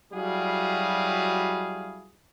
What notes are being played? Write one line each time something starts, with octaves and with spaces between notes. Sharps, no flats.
F#3 G3 E4 F#4 G#4 F5